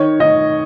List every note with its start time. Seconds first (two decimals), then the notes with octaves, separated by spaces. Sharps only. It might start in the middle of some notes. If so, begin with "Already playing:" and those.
Already playing: D#3 C#5
0.20 D#3 D#5